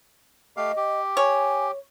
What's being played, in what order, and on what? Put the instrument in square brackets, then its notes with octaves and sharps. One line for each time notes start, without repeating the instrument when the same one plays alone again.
[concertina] A3 G4 F5 [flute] D#5
[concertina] G4
[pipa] C#5 [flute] G#5